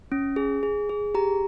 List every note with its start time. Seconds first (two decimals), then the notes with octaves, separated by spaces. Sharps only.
0.12 C#4
0.36 G#4
0.63 G#4
0.89 G#4
1.15 G4 A#5